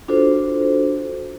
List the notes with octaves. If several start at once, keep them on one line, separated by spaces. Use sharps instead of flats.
D4 F4 F#4 A4 C5